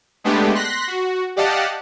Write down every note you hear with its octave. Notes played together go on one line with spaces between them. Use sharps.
G#3 A3 B3 D4 G4
C6 F#6 A#6 B6
F#4
G4 D5 D#5 F5 F#5 A5